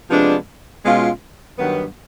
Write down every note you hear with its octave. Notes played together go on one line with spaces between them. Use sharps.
C3 F3 G#3 B3 D4
B2 G#3 C#4 F4
G2 D#3 F#3 B3